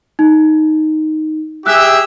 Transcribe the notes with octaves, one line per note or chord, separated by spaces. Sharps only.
D#4
G4 G#4 E5 E6 F#6